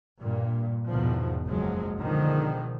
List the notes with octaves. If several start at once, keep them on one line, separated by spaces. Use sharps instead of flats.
G2 A#2
E2 G#2 B2 D#3 F3
F#1 C#2 F3 F#3 G#3
B2 D3 D#3 F3 G#3